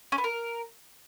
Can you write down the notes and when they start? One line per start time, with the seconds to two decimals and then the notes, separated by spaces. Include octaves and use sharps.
0.12 C#4
0.18 B3
0.24 A#4